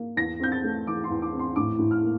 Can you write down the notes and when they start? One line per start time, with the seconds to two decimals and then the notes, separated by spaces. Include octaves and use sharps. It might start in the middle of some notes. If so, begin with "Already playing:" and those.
Already playing: A#3
0.16 E2 A#6
0.40 C4 G6
0.52 A6
0.64 A3
0.87 E3 D6
1.04 C6
1.10 E2
1.22 D6
1.33 C4
1.39 C6
1.56 A2 D6
1.79 A2
1.91 F6
2.03 A#3